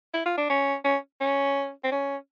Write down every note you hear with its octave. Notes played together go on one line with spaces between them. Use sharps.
E4
F4
D4
C#4
C#4
C#4
C4
C#4